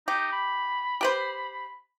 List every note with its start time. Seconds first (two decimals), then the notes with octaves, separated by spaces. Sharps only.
0.08 D#4 G4
0.33 B5
1.01 G4 B4 C5